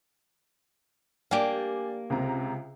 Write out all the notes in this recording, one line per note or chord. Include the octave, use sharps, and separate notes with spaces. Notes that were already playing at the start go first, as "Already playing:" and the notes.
A#3 D4 G4 D5 G#5
C#2 C3 A#5